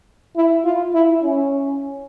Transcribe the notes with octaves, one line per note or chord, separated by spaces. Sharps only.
E4
F4
E4
C#4